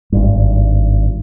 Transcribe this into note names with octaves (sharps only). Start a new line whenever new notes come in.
G#1 G2